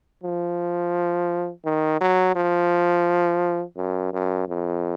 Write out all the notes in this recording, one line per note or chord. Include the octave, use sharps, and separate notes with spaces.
F3
D#3
F#3
F3
F#2
F#2
F2